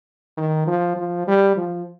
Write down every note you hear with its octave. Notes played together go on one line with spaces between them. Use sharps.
D#3
F3
F3
G3
F3